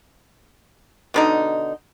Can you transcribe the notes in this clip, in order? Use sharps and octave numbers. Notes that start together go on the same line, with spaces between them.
B2 D3 D#4